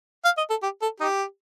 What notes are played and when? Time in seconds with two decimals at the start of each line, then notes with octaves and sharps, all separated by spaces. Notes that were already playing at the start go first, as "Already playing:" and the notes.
0.25 F5
0.38 D#5
0.50 A4
0.63 G4
0.82 A4
1.00 D#4 G4